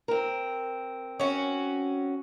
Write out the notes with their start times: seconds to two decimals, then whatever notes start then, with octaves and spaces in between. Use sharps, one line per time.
0.08 C4 A#4
1.20 C#4 F#4